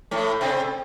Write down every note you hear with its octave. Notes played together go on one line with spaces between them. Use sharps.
A2 A3
C3 C4